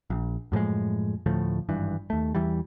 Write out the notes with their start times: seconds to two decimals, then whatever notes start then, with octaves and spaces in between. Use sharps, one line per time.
0.10 A#1
0.52 F#2 A2 F3 G#3
1.26 D2 A2 F3 A3
1.69 G#1 G2 E3
2.10 D#2 A3
2.35 E2 E3 G3